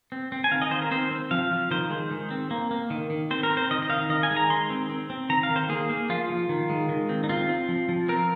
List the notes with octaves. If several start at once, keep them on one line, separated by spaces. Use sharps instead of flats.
C4
C4
G#5
D#3 F5
D#5
D#3 C5
A#4
C4 C5
C4
F3 F5
F3
D#3 C5
G#3
D#3
C4
A#3
A#3
D#3
D#3
C4 C5
A#4
C4
C5
D#3 D#5
D#5
D#3 F5
D#3 D#5
G#5
G#3
A#5
D#3 C6
C4
C4
C4
D#3 A#5
F5
D#3
C5
A#3 G#4
A#3
F3 F4
F3
D#3
G#3
D#3
C4
D#4
C4 F4
C4
F3
F3
C4 A#4